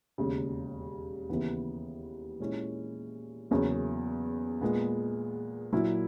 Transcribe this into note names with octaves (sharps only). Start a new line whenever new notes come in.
E1 D#2 C#3
D#2 C#3 E3 B3
A#2 G#3 C#4 E4
E2 C#3 F#3 A#3 C#4
A#2 G#3 B3
A#2 F#3 A#3 E4